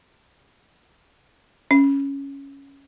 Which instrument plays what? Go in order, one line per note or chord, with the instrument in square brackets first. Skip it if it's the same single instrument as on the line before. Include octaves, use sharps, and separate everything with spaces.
[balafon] C#4